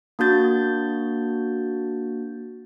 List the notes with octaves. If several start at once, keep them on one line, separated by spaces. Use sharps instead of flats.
A#3 D4 F#4 G6 A6